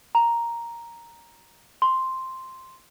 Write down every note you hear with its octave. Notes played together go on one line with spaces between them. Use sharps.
A#5
C6